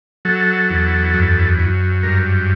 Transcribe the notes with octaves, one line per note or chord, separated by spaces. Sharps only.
F#3 A4
E2
F#2
F#2
G2 A#4